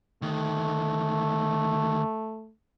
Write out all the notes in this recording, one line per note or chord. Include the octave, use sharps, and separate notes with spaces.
D2 D#3 A3